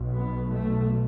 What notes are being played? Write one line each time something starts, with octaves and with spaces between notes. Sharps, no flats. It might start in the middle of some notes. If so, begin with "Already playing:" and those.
Already playing: B1 B2
B3
A3